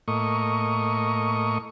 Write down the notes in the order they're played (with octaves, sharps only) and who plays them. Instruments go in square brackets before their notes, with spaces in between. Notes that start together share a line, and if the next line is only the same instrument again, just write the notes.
[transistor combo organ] A2 A#3 D#5 C#6